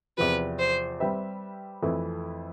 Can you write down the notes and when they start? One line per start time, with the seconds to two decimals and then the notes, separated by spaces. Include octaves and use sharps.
0.18 E2 C3 F3 B4
0.59 C5
1.00 G3 C4 G4 B4 E5
1.82 F2 E3 A3 E4 B4